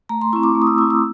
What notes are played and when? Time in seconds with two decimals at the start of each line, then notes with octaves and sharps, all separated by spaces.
0.09 A3 A#5
0.22 C6
0.33 C4 E4 C#6
0.43 D6
0.55 A3
0.62 D#6
0.67 E6
0.78 C4 E4 E6
0.90 E6